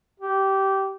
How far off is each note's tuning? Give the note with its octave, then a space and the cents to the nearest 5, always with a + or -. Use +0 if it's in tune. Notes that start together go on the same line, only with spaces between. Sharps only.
G4 -15